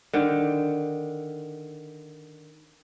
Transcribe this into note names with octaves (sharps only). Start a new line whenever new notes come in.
D3 D#3